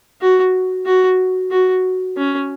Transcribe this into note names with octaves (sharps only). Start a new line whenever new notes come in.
F#4
F#4
F#4
C#4